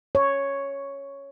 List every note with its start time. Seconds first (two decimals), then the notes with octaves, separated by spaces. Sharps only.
0.15 C#5